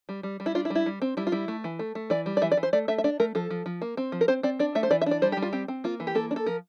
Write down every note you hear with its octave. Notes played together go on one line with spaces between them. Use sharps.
G3
G3
G3
E4
D4 F4
E4
G3
E4
G3
C4
G3 E4
F4
G3 E4
A3
E3
A3
A3
E3 D5
G3
D5
E3 E5
D5
E3
C5
A3 D5
A3 E5
E5
D4 D5
A3 A#4
F3 A4
F3
F3
A#3
C4
F3
A#4
C4 C5
C4 D5
D4 D5
A3 E5
C5
E3 D5
E5
D4 D5
G3 C5
G4
G3
F4
C4 G4
C4
A#3 F4
E3
G4
A#3 A4
D4
A4
F3 A#4